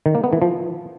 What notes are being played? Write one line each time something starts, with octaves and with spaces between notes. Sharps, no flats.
D#3
A#3
B3
E3
F3